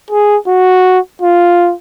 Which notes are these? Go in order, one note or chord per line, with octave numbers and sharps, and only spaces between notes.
G#4
F#4
F4